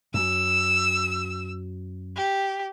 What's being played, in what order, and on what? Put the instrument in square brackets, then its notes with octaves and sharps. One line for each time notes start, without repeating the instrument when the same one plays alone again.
[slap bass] F#2 [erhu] E6
[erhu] G4